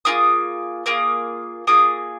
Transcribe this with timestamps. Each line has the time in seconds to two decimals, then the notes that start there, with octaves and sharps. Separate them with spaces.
0.05 A#3 F4 G#4 D#6
0.86 A#3 F4 G#4 D#6
1.67 A#3 F4 G#4 D#6